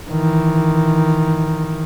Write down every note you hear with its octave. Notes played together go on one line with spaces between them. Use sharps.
D#3 E3